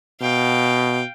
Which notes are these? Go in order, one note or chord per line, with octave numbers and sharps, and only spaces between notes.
B2 F5 G5